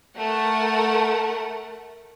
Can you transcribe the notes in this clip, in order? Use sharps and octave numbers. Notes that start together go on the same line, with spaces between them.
A3 A#4 F#5